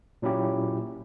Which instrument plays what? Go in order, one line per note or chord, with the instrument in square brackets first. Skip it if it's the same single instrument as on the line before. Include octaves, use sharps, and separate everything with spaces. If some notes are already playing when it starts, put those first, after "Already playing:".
[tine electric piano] A#2 F#3 C#4 E4 G4